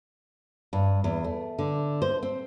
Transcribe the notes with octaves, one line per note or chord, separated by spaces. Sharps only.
G2
E2
A3
D3
C5
C4